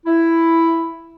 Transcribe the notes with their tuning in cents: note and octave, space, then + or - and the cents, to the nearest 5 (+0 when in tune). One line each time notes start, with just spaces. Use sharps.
E4 +5